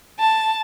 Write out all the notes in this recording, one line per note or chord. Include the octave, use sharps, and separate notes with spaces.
A5